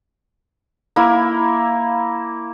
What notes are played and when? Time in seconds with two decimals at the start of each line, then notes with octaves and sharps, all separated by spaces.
0.96 A#3 E4